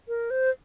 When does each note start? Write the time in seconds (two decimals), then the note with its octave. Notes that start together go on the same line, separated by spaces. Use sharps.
0.08 A#4
0.30 C5